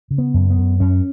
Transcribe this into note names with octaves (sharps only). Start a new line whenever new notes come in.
C#3
B3
F#2
B3
F#2
F#2 C#4